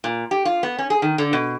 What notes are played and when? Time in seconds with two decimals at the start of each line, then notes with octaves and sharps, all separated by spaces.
0.04 A#2
0.31 G4
0.45 F4
0.63 B3
0.79 C#4
0.90 G#4
1.02 D#3
1.18 D3
1.33 B2